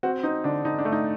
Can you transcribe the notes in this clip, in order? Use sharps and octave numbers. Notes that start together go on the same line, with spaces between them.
C4 F#4
C4 D#4
D3 D4
D3 D#4
D4
A3
D#4